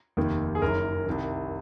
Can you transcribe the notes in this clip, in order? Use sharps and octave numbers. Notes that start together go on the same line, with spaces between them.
F1 D#2 D#3
G#4
F#1 F#2 D#3 A#4
C2 C3 D#3